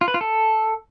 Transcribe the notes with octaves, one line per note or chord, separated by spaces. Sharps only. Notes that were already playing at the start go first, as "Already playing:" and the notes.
F4
B4
F4
A4